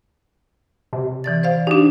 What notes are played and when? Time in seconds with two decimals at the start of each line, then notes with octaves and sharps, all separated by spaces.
0.93 C3
1.24 E3 D5 A6
1.43 C5 D5 F5
1.67 D4 D#4 G4